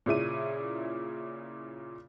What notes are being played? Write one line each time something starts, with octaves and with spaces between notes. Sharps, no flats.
A#2 C#3 E4 D#7